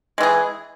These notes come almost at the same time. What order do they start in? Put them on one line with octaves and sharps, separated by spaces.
G#3 E3 G#4